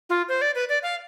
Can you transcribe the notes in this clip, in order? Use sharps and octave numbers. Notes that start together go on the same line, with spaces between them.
F4
C5
D5
B4
D5
F5